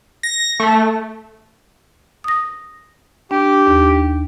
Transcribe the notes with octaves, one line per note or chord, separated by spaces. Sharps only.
A#6
A3
D#6 A#6
D4 G4
D#2 D4